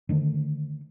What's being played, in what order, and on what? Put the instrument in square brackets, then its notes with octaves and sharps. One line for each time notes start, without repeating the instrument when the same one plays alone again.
[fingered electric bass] D3 D#3 A3